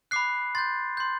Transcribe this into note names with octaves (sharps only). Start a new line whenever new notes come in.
B5 D6 F#6 C7
C6 G6 A6
C6 G6